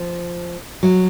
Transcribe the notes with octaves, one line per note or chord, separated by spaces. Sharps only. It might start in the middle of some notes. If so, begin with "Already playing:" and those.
Already playing: F3
F#3